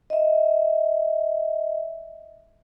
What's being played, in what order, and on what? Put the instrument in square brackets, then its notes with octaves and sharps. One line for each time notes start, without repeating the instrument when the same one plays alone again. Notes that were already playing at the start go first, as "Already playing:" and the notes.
[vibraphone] D#5 E5